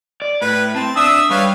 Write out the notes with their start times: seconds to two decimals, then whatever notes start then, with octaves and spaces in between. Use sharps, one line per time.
0.22 D5
0.42 A2 B4
0.75 C4 A5
0.96 D4 E5 D#6 E6
1.30 G3 B4 C#5 F5